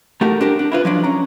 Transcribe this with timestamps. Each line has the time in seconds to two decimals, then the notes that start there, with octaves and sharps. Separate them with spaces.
0.21 A3 D#4 F#4 G4 A#4
0.41 D4 G4 A#4
0.59 D4
0.72 E4 F4 B4
0.85 F3 F#3 D4
1.03 C#4 A#5